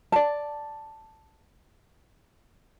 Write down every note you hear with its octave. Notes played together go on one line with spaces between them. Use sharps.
D5 A5